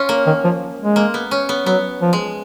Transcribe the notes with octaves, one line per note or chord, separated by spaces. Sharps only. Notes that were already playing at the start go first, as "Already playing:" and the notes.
Already playing: C#4 F4
A#3
D#3
F3
G#3
A#3
B3
C#4
B3
F#3 B3
F3
G#3